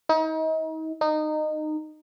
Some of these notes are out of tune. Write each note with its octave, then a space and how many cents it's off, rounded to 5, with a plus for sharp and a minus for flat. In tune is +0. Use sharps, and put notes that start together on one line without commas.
D#4 +35
D#4 -20